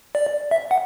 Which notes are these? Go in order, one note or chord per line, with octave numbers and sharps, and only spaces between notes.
D5
E5
F#5